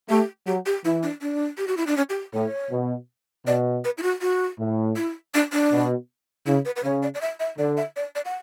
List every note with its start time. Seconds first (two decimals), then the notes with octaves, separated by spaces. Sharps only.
0.09 A3 G4
0.47 F#3 G4
0.66 G4
0.85 E3 E4
1.03 D4
1.21 D4
1.58 G4
1.68 F#4
1.77 E4
1.87 D4
1.97 C#4
2.10 G4
2.34 A2 C#5
2.71 B2
3.46 B2 D5
3.85 B4
3.98 E4
4.03 F#4
4.21 F#4
4.60 A2
4.97 E4
5.34 D4
5.53 D4
5.72 B2
6.46 C#3 E4
6.65 B4
6.76 B4
6.84 C#3 C#5
7.03 D5
7.14 D5
7.21 E5
7.40 E5
7.58 D3 D5
7.77 E5
7.96 D5
8.15 D5
8.25 F#5